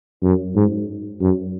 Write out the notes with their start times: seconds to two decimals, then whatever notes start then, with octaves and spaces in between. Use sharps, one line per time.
0.23 F#2
0.56 G#2
1.21 F#2